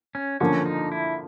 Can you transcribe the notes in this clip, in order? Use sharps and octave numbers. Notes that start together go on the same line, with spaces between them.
C#4
D3 F3 A#3 C#4
D#4
E4